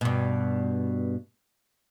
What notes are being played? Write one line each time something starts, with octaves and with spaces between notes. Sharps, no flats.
G2 B2